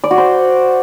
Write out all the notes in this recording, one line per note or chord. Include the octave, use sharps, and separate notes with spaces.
D5
F#4
C5